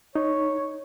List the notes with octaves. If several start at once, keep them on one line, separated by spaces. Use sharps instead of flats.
D#4 C#5